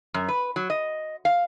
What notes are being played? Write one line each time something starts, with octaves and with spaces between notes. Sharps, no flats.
F#2
B4
F#3
D#5
F5